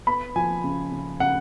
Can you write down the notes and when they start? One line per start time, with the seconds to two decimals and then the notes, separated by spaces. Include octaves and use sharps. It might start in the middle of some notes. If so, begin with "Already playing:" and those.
0.07 B3 B5
0.36 F3 G#5
0.64 C#3
0.92 C#3
1.20 C#3 F#5